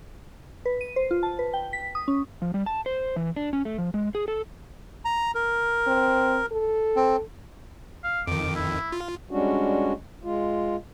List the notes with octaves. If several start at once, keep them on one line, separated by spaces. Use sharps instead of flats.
B4
D#7
C5
F4
A5
B4
G5
B6
D#6
C#4
F3
G3
A5
C5
E3
D4
C#4
A3
F3
G#3
G#4
A4
A#5
A#4
C4
A4
C4
F5
F2 D#3 D6
E4
F4
G3 G#3 C#4 D4 F#4
G#3 F4